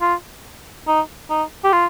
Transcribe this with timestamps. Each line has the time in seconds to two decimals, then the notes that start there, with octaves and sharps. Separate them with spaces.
0.01 F4
0.87 D#4
1.30 D#4
1.64 G4
1.73 F4